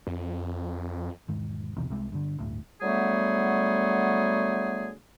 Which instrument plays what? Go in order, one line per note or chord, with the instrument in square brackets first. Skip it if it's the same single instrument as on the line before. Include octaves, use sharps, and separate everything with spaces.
[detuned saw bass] F2
[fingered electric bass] E1 G#2 D#3
B1 E2 C3 D#3
C2 C3 G#3
G2 D3
G1 D2 A2
[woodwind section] D3 F#3 G3 A3 B3 G#4